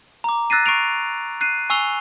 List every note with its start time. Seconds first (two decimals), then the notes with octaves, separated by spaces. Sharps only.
0.24 A#5 D6
0.50 E6 F#6 A6 A#6 C7 D#7
0.66 C#6 C7 D7 F7
1.41 F#6 C7 D#7
1.70 G#5 C#6 E6 C7 F7 G7